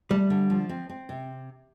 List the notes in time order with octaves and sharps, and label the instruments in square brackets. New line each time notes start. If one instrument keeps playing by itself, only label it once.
[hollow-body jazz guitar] G3 [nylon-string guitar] A3
[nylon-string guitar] D3
F3
C4
C4
C3